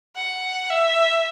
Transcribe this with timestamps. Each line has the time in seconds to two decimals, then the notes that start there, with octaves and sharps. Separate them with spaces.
0.16 F#5
0.69 E5